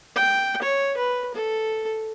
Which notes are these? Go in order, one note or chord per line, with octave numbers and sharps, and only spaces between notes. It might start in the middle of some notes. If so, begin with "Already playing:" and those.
G5
C#5
B4
A4